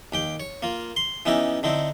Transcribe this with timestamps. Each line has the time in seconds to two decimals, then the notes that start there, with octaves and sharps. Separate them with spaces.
0.12 D#2 G4 G5
0.40 C#5
0.62 A#3 F4
0.96 C6
1.26 E3 B3 C#4 D#4 E4 G4
1.63 D3 C4 D#4 E4